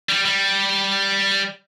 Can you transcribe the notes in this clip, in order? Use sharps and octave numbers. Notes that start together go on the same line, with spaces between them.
G3
G3